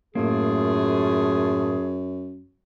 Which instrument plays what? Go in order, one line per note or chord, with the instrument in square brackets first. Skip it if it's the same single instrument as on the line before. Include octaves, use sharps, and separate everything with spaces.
[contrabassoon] F#2 [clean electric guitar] A2 A#3 [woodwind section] A3 F4 G#4